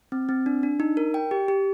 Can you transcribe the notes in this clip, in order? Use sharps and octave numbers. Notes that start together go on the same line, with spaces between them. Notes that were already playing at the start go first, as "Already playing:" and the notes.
C4
C4
D4
D4
D#4
A#4
G5
G4
G4